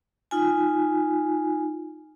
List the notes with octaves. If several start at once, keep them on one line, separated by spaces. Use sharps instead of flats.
D#4 F4 G#5